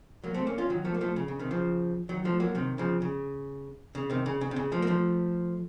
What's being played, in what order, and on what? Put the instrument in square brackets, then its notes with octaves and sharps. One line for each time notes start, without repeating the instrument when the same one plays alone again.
[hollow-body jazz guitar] F#3 A#3
A3 C4
A#3 C#4
C#4 F4
D#3 F#3
F3 A3
A#3
F3 A3
C#3
C#3
C3 D#3
C#3 F3
D#3 F#3
F3 A3
F#3 A#3
C3 D#3
C#3 F3
C#3
C#3
C3 D#3
C#3
C#3
C3
C#3
F3 A3
A#3
F3 A3